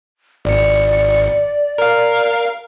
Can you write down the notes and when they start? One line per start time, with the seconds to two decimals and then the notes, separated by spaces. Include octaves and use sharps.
0.45 G#1 D5 C#7
1.78 A#4 F5